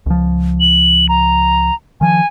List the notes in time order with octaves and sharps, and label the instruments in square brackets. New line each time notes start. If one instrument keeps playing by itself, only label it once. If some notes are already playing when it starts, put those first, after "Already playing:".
[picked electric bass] C#2 F3
[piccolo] F#7
A#5
[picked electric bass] D#3 F3 [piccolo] G#5